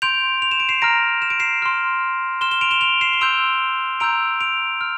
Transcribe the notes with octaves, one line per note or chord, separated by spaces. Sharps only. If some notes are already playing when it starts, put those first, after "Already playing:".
C6 G6 D7 F7
F7
E7
D7
C7 E7
A#5 F6 A#6 D7
E7
D7
C7 E7
C6 F6
C6 F6 E7 G7
E7 G7
D7 F7
E7 G7
D7 F7
C7 E7
G7
C6 E6 G6 D7 F7
A#5 E6 G6 D7 F7
D7 F7
F6